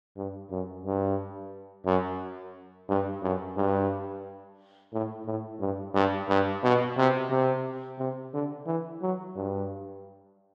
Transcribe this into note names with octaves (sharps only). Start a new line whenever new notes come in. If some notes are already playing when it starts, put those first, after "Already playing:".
G2
F#2
G2
F#2
G2
F#2
G2
A2
A2
G2
G2
G2
B2
C3
C3
C3
D3
E3
F#3
G2